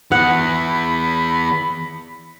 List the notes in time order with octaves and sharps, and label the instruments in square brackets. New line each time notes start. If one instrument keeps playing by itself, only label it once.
[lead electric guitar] E3 B3 [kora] F#5 [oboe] B5